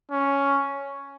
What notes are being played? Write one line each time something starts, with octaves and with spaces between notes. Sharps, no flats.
C#4